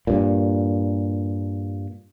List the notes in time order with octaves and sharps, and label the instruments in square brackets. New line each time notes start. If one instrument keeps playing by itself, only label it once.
[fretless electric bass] G2 A#2